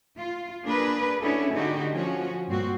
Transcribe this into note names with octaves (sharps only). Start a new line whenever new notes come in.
F4
A#3 D4 G#4 A#4 B4
C#4 D4 E4 F#4 G#4 A4
D3 D#4 F#4 G4
F3 C#4 F#4
G2 A#2 C4 F#4